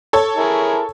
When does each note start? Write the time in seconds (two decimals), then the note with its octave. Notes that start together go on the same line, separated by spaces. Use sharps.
0.13 A4 C#5
0.36 E4 G#4 A#4